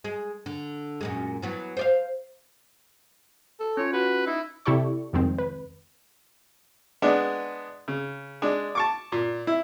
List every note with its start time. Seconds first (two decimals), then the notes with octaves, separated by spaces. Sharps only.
0.04 G#3
0.46 D3
1.01 F#2 A#2 G#3
1.42 E3 F#3 B3
1.77 C5 D5 F5
3.60 A4
3.77 C#4 F4 C#5
3.93 F#4 B4
4.27 D#4 E4
4.65 C3 E4 G4 A4 D5 C#6
5.13 C2 F2 D#3 G#3 C4
5.38 B4
7.02 G#3 B3 D4
7.88 C#3
8.42 G#3 D4
8.75 A5 C#6 D6
9.12 A#2
9.47 E4